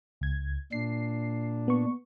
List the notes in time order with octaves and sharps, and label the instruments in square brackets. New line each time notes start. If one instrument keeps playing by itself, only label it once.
[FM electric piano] C#2 G#6
[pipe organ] A#2 D4 [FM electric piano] C7
[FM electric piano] B3 C#6